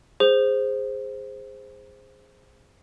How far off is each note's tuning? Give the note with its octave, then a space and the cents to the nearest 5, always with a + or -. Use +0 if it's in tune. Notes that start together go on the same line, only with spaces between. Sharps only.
G#4 -15 C5 +0